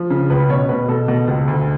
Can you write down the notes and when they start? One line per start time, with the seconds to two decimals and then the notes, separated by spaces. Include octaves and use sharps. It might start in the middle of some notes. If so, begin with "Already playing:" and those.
Already playing: F3
0.10 C#3
0.30 C#2 B4
0.49 B2 C#5
0.69 B2 B4
0.88 B2 A4
1.08 B2
1.27 C#2
1.48 D2